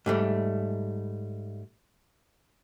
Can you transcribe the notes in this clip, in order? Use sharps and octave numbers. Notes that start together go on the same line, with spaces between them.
G#2 G3 A3